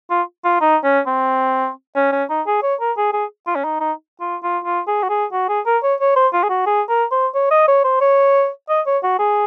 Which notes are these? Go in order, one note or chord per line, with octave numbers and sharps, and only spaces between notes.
F4
F4
D#4
C#4
C4
C#4
C#4
D#4
G#4
C#5
A#4
G#4
G#4
F4
C#4
D#4
D#4
F4
F4
F4
G#4
F#4
G#4
F#4
G#4
A#4
C#5
C#5
C5
F4
G#4
F#4
G#4
A#4
C5
C#5
D#5
C#5
C5
C#5
D#5
C#5
F#4
G#4